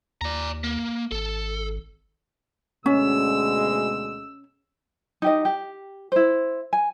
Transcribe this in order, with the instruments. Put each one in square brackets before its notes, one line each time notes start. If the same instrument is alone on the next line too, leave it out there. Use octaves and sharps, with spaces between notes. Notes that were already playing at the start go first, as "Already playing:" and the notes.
[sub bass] D#2 [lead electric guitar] D5 A#5
[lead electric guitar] A#3
[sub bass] G#1 [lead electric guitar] A4
[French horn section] D2 B2 G#3 [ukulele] C#4 [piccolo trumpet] E6
[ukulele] D#4 G4 D#5
G4
E4 C5
G#5